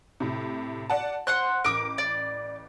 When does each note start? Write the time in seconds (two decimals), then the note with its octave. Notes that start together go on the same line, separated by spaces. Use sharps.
0.20 A2 C3
0.90 D5 F#5 A5
1.27 C5 F#5 C6 F#6
1.64 A1 A#4 D6
1.98 D5